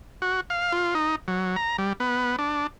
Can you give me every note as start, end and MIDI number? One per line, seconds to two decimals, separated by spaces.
0.22 0.41 66
0.50 0.72 77
0.72 0.94 65
0.95 1.16 63
1.28 1.56 54
1.56 1.77 82
1.78 1.93 55
2.00 2.36 59
2.39 2.67 62